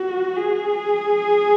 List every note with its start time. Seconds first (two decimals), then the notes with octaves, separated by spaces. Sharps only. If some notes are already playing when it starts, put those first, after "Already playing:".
Already playing: F#4
0.37 G#4